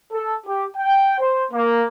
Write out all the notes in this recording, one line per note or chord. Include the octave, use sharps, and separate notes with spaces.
A4
G4
G5
C5
A#3